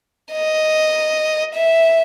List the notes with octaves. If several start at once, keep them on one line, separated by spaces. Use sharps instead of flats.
D#5
E5